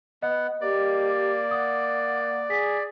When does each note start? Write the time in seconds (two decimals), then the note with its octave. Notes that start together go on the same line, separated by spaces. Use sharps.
0.22 B3 D#5 F#5
0.61 A#3 G4 D5
1.51 F#5 D#6
2.50 G#4 B6